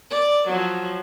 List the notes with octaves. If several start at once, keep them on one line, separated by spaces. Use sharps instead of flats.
D5
F3 F#3